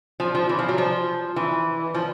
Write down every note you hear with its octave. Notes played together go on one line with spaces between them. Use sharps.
F3
F3
E3
F3
F#3
F3
E3
F3